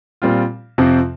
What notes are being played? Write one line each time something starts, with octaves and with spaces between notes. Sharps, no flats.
A#2 G3 C4 F4
F2 C3 F3 C4